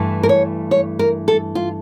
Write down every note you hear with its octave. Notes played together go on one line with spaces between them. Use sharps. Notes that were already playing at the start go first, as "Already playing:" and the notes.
Already playing: G2 E3 A3
A#4
C#5
C#5
A#4
A4
F4